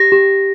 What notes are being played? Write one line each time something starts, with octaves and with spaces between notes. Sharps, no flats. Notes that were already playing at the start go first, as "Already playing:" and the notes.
Already playing: G4 A#6
G4